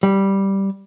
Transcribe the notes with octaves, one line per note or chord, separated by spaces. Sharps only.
G3